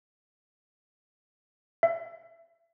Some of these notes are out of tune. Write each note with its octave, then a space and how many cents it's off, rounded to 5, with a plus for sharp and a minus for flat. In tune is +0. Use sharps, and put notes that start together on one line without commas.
E5 +25